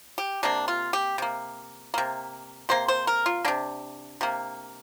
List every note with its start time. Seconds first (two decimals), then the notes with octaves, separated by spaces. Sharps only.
0.18 G4
0.43 C3 A#3 D4
0.68 F4
0.93 G4
1.18 C3 A#3
1.94 C3 A#3
2.69 C3 A#3 C5
2.88 C5
3.07 A#4
3.26 F4
3.45 C3 A#3 D4
4.21 C3 A#3